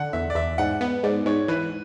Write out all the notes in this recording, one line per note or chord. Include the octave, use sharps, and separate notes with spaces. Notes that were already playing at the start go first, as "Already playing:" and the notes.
Already playing: D3 F#5
E2 E5
D5
E2 E5
G#2 F#5
B3 F#5
G#2 D5
G#2 C#5
E3 B4